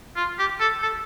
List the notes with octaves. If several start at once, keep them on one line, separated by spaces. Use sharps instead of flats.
F4
G4
A4
A4